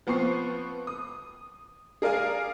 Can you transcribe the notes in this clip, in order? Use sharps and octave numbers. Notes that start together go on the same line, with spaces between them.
F3 B3 C4 C#6 C7
D#6
G#4 A#4 D5 F5 G#5